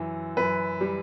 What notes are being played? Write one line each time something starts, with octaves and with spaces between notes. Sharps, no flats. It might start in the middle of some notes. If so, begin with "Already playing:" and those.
Already playing: F#2 E3
F#2 B4
G3